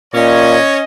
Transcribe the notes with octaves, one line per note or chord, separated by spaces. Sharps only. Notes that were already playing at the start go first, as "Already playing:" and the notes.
A#2 C#4 C#5 D#5